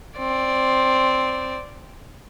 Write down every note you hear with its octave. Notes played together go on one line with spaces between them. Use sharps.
C4 D5